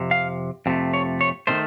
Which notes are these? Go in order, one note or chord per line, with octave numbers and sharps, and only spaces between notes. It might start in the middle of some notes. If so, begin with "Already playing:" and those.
Already playing: F2 C3
F5
F2 C3 A3
C#5
C#5
C3 D#3 A3 C5